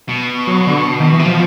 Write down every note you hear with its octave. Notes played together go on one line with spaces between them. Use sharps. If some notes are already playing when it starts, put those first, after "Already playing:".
B2
F#3
D3
D#3
E3
C3
B2 F3